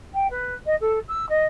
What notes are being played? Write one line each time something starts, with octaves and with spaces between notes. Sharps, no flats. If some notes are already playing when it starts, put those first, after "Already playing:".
G5
B4
D#5
A4
E6
D#5